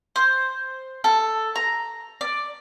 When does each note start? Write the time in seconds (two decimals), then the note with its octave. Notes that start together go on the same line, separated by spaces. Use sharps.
0.16 C5
1.04 A4
1.56 A#5
2.21 D5